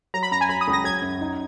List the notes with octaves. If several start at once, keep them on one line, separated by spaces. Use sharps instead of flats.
F#3 A#5
B5
F#2 A#5
G#5
F#3 B5
D#6
C#2
A#6
F#3 G#6
F#2
D#4